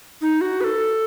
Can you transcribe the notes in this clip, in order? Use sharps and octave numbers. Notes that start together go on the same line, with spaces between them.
D#4
F#4
B4
A4